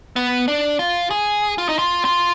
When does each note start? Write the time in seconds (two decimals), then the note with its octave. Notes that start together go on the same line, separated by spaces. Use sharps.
0.16 B3
0.48 D4
0.79 F4
1.11 G#4
1.58 F4
1.69 D#4
1.79 F4
2.05 F4